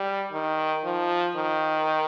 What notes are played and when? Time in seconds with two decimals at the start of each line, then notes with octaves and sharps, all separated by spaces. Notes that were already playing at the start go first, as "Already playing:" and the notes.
Already playing: G3
0.32 D#3
0.84 F3
1.36 D#3